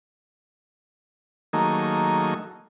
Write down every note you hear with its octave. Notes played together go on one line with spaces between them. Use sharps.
D#3 F#3 A3 A#3 D#4 G#4